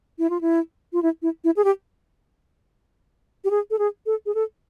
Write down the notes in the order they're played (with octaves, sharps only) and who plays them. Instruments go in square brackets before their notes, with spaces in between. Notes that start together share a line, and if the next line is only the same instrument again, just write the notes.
[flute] E4
F4
E4
F4
E4
E4
E4
G#4
G4
G4
G#4
A4
G#4
A4
G#4
A4